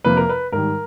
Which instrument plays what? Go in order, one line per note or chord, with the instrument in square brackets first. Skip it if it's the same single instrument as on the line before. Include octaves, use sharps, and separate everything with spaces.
[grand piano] F2 C3 F3 A#3 B4
A#4
B4
G#2 D#3 G3 A#4